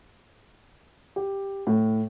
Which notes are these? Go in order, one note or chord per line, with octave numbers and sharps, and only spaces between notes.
G4
A2